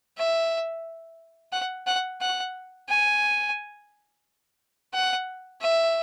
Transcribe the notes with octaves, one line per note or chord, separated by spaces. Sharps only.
E5
F#5
F#5
F#5
G#5
F#5
E5